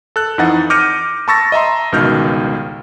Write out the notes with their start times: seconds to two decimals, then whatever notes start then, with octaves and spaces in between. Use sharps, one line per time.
0.16 A4 F#6
0.38 F2 E3 D#4 F#5 A6
0.70 D6 F6 G6 A#6 C#7 D#7
1.28 A5 B5 C#6 E6 A6 A#6
1.52 D#5 E5 A#5 C6
1.92 G1 C#2 B2 D#3 F6 G6